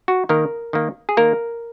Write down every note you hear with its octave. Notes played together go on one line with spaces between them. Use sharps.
F#4
D#3 A#3 A#4
D#3 A#3
G#4
D#3 A#3 A#4